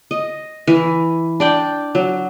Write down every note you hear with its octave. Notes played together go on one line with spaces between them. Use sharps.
D#5
E3
D4 D5 G5
F#3